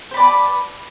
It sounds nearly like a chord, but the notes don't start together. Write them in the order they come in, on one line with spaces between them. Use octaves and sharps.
C5 B4 D5 A5